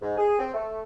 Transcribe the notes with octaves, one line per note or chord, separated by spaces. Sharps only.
G#2
G#4
C4
A3